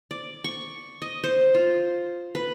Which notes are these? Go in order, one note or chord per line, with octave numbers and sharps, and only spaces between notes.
D5
C#6
D#5
C5
F4
B4